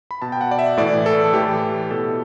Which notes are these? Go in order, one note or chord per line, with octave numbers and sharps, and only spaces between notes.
B5
B2 A5
G5
F#5
D5
E5
A2 E3 D5
A4
A4
A2 E3 G4
B2 A4